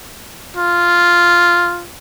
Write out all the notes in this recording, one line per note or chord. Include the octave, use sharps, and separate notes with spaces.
F4